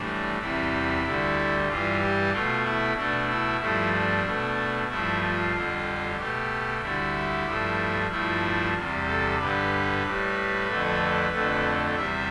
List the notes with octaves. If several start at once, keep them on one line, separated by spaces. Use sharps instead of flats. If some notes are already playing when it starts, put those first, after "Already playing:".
Already playing: A2 E3 G3 D4
E2 C3 E3 G3 E4
D2 D3 G3
G2 E3 G3 F4
G4
B2 A3 F4
E4
B2 A3 D4
E4
G2 F3 A3 E4
D4
B2 A3
G2 F3 A3 E4
F4
F2 D3 G3
B2 A3 G4
D2 D3 G3 E4
G2 F3 A3
G2 F3 A3 E4
E2 C3 G3
A4
G2 D3 G3 B4
A2 G3
F2 D3 A3
F2 D3 A3
E2 C3 G3 E5